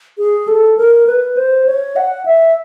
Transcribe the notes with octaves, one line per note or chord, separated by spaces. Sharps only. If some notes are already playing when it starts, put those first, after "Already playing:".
G#4
A4
A#4
B4
C5
C#5
F#5
E5